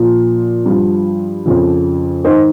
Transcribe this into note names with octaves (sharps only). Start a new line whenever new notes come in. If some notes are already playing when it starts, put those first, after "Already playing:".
Already playing: A#2 F3
G2 F3
F2 C#3 F3
G#2 D#3 C5 D#5